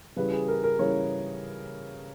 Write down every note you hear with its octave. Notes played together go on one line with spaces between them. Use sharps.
C#3 E3 G3 B4
G#4
A#4
A#4
C#3 E3 G3 C#5